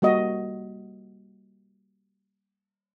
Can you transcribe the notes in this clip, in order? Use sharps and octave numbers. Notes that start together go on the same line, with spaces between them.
G3 A#3 F#4 D#5